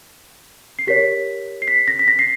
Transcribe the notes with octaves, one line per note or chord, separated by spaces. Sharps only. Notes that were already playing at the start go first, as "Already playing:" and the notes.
C7
G4 A#4 C#5 B6
C7
B6
A#6
B6
A#6
C7